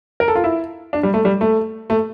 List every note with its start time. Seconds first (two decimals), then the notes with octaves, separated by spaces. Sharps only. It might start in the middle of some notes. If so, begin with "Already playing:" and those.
0.20 A#4
0.28 A4
0.35 F4
0.44 E4
0.93 D4
1.03 G3
1.14 A3
1.25 G3
1.41 A3
1.90 A3